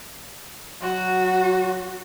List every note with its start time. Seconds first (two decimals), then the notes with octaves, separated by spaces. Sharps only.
0.82 F#3 F#4